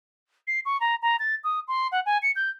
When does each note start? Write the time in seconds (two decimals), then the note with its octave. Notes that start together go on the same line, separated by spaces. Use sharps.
0.47 C7
0.65 C#6
0.80 A#5
1.02 A#5
1.19 A6
1.44 D#6
1.68 C6
1.92 F#5
2.06 G#5
2.22 C#7
2.36 G6